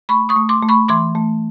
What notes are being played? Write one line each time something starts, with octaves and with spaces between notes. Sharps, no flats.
A3 B5 C#6
C#6 D#6
A3
C6 D6
A3
B5 C#6
E3 C6 D6
A3